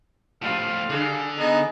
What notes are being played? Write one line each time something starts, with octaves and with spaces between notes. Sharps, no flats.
A2 F3 G3 F4 F5
D3 G3 D4 G#4
B3 D#4 G#4